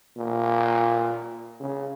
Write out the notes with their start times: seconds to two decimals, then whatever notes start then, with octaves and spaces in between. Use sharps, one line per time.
0.17 A#2
1.60 C#3